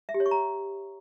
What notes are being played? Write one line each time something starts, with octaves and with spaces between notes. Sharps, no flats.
E5
G4
C#5
C#6
A#5